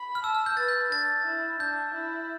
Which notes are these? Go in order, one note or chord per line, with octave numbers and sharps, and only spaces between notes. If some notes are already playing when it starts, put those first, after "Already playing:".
Already playing: B5
F6
A5 E6
F6
G6
B4 A6
G6
D4 A6
E4
D4 G6
E4